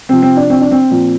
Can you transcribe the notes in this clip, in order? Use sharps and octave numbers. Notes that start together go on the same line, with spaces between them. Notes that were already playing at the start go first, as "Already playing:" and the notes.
C3 F3 C4
C4
D4
C4
D4
C4
A#2 F3